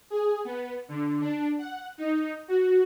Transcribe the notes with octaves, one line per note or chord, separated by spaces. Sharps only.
G#4
B3
D3
D4
F#5
D#4
F#4